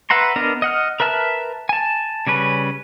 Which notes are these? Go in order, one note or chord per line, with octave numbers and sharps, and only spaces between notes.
B4 E5 F#5 A#5 C6
B3 D4 A#4 D#5
D#5 F#5 F6
A#4 B4 E5 A5 F6
G#5 A5
C#3 G3 C#4 B4